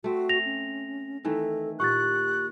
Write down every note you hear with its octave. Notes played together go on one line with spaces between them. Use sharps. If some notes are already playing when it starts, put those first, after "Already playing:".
A3 C4 F#4
A#6 F7
C#4
D#3 E3 A3 A4
A#2 G4 F#5 C#6 F#6 A6